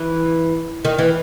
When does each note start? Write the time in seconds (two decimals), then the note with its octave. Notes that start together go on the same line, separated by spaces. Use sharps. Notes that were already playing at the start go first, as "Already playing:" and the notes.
Already playing: E3
0.85 D#3
0.99 E3